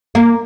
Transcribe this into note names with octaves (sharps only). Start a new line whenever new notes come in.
A#3